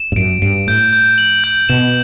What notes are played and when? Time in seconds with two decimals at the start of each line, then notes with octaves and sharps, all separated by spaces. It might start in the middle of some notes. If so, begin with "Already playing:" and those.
Already playing: E7
0.12 G2
0.16 F#2 D7
0.42 G2 D7
0.67 A2 G6
0.93 G6
1.18 F#7
1.44 G6
1.69 B2 E7